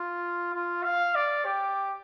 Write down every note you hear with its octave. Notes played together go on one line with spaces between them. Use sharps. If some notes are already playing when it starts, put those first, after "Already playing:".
Already playing: F4
F4
F5
D5
G4